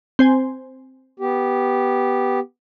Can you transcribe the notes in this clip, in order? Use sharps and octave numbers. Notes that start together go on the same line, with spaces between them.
C4 C5 G#5
B3 G4